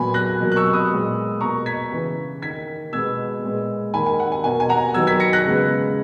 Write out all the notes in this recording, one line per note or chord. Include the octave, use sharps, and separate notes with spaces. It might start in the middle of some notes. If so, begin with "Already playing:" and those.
Already playing: A#2 F#3 B3 G#5 B5
F#6 A#6
B2 F#3 A#3
F#6
C#6 E6
B5 D#6
A#2 G#3 B3
B2 A#3 A#5 C#6
G#6 B6
C#3 E3 B3
D#3 A#3 G#6 B6
B2 G#3 B3 E6 G#6
A#2 G#3 B3
D#3 A#3 G#5 B5
G#5
F#5
G#5
B2 A#3 G#5
G#5
F#5 A#5
D#3 F#3 B3 E6 G#6
G#6 B6
A#6 C#7
F#6 A#6
C#3 G#3 B3